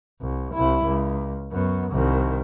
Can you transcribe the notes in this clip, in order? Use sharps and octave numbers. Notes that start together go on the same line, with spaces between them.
C2
C2 E4
C#2
F#2 B3
C2 D#3